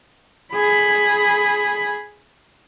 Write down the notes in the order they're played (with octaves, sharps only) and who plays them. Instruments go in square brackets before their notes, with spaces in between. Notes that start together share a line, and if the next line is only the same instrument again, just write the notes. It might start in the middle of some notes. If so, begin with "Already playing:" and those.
[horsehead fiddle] G#4 B5